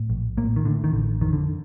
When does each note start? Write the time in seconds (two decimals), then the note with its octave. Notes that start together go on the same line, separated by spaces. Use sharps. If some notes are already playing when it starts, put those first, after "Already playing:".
Already playing: A2
0.10 A#1
0.37 A2 A#3
0.56 D#3
0.65 A2 D3
0.84 D#3
0.93 A1 D3
1.21 F2 D#3
1.33 D3